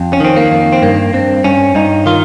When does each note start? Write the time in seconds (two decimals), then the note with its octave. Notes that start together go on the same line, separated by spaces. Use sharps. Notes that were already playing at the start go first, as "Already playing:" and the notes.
Already playing: F2
0.13 C#4
0.20 D#3 C4
0.37 A#3
0.52 F2
0.73 C4
0.82 G2 A#3
1.14 G2 C4
1.44 G2 C#4
1.75 G2 D#4
2.06 D#3 F4